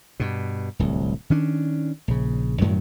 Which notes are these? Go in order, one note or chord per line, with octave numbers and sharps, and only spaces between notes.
G2 B2
D1 C2
D#3 C#4 D4
A#1 C#3
F#2 A2 D#3 F#3